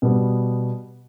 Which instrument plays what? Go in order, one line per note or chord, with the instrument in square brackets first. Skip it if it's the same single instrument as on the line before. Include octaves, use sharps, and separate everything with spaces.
[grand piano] B2 G3 B3